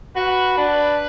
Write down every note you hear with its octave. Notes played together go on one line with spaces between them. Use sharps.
F#4 B4
D4 B4